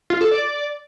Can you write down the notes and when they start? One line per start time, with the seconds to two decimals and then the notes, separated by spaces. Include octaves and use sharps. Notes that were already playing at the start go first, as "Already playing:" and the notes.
0.10 F4
0.21 A4
0.31 D5